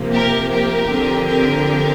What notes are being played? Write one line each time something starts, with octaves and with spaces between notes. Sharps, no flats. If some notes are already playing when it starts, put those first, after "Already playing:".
Already playing: C3 F3 A#3
G4 A#4
G4 A#4
D3 F3 C4
G4 A#4